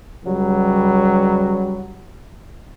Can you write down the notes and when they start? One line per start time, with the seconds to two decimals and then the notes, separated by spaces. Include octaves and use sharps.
0.24 C#2 F#3 G3